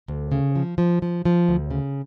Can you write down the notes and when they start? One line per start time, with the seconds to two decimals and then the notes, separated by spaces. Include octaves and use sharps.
0.08 D2
0.32 C#3
0.56 F3
0.78 F3
1.02 F3
1.25 F3
1.48 D2
1.71 C#3